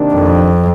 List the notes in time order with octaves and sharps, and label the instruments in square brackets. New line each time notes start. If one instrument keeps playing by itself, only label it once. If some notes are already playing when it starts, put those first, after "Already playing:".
Already playing: [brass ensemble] C3 D#3 A#3 D4
[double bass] F2